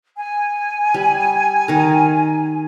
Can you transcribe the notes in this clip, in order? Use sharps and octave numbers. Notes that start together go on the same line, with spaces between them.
G#5
G3
D#3 A#4